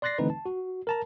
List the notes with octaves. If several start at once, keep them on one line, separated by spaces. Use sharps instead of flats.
D5 C6 F#6 A6 A#6 C7
D3 E3 A3 C4 D#4 B4
A5
F#4
A#4 A5 A#5